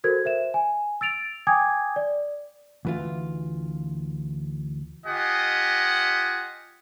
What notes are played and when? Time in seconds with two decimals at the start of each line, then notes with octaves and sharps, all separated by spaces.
0.04 F#4 A4 A#4 C5 G#6
0.25 C5 E5 E7
0.54 G#5
1.01 E6 A6 D7 F7
1.47 G5 G#5 D6 D#6 G#6
1.96 D5
2.85 D2 E3 F4
5.06 F4 G4 D#5 F#5 G#5